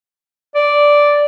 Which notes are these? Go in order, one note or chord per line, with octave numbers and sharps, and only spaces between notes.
D5